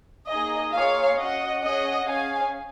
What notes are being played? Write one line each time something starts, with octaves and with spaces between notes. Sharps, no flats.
A#3 D#4 G#4 D#5
A#3 F4 G#4 C#5 F5
C#4 F#4 D#5 F#5
C#4 G#4 D#5 F#5
C#4 G#4 F5 G#5